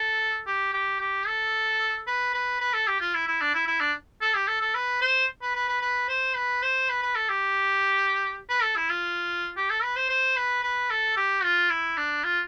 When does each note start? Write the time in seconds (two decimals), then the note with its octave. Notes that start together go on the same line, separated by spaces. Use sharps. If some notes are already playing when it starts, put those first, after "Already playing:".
Already playing: A4
0.47 G4
0.73 G4
1.00 G4
1.27 A4
2.07 B4
2.34 B4
2.61 B4
2.73 A4
2.87 G4
3.01 F4
3.14 E4
3.27 E4
3.41 D4
3.54 E4
3.67 E4
3.81 D4
4.21 A4
4.35 G4
4.48 A4
4.61 A4
4.75 B4
5.01 C5
5.42 B4
5.55 B4
5.68 B4
5.81 B4
6.09 C5
6.36 B4
6.62 C5
6.89 B4
7.02 B4
7.15 A4
7.29 G4
8.49 B4
8.62 A4
8.76 E4
8.90 F4
9.56 G4
9.70 A4
9.83 B4
9.96 C5
10.09 C5
10.36 B4
10.63 B4
10.90 A4
11.17 G4
11.43 F4
11.70 E4
11.97 D4
12.24 F4